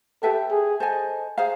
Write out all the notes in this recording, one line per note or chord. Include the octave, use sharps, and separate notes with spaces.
G4 A4 B4 E5 G5
G#4
A4 C5 D#5 G#5
G#4 C5 F5 A#5